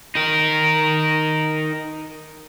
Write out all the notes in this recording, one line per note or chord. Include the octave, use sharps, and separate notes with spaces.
D#4 A#4